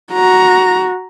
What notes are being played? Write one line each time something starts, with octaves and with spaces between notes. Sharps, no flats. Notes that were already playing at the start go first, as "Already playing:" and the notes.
F#4 A#5